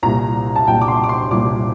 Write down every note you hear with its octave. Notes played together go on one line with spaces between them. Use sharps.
C2 A#2 G3 A#5
A5
C2 A#2 G3 G5
D6
C6
D6
C6
C2 A#2 G3 D6